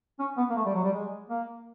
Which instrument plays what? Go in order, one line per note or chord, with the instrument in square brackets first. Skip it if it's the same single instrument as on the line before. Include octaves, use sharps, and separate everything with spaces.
[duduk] C#4
B3
A#3
A3
G3
F#3
G3
G#3
A#3